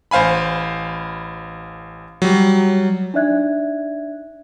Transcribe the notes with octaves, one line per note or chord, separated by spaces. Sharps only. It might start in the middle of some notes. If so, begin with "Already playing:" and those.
A1 C5 F5 G#5 B5
F#3 G3
D4 D#4 D5 E5 F#6 G#6